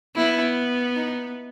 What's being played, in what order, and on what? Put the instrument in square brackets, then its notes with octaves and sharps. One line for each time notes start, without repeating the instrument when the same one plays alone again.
[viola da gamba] B3 [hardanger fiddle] E4
[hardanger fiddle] D#4